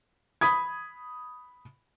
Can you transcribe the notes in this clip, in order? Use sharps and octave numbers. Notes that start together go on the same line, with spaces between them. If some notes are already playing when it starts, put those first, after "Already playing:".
B5 D#6 G#6